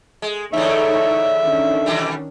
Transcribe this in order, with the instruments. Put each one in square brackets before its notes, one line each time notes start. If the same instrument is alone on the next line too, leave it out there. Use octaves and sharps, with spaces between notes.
[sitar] G#3
[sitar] E2 A2 D3 [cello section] D#4 C#5 [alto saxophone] E5
[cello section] D#3 C#4 D4
[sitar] B2 E3 G3